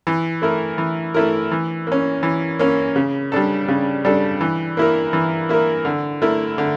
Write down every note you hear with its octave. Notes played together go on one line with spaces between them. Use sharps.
E3
A3 E4 A#4
E3
A3 E4 A#4
E3
A#3 C#4
E3
A#3 C#4
C#3
G3 D4 A4
C#3
G3 D4 A4
E3
A#3 E4 A#4
E3
A#3 E4 A#4
D3
A3 E4 A#4
D3